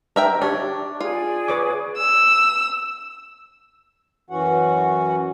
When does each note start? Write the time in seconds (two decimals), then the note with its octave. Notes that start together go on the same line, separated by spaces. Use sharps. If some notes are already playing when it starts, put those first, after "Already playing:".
0.16 D#4 A#4 E5 G5
0.42 D4 G4 C#5
1.00 F4 G#4 D5 G#5
1.48 B4 C#5 D6
1.98 E6
4.30 F#2 E3 C#4 F#4 F#5